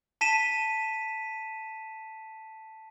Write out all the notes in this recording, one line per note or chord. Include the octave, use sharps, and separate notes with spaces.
A5 B6 D#7 E7